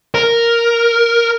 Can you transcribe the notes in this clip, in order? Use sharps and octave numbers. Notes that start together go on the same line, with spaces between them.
A#4